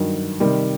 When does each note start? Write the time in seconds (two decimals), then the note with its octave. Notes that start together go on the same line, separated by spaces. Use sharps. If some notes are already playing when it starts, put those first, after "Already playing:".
Already playing: G2 D#3 F#3
0.40 C3 D#3 G3